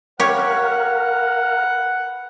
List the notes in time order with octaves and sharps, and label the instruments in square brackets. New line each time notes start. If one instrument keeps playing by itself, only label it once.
[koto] G4 C#5 [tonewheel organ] A#4 F5 [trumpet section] B4 F#5